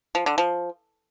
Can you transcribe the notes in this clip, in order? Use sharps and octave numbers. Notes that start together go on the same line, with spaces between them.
F3
D3
F3